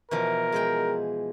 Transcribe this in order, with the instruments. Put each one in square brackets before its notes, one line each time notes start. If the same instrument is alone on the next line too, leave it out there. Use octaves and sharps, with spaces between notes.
[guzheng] B2 E3 F3 [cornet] A#4
[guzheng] G#3 G#4 G5